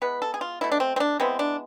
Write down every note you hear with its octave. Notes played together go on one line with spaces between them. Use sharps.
E3 G#3 B3 B4
A4
G#4
F4
B2 A3 E4
D4
C4
C4
D4
E3 G#3 B3 C4
D4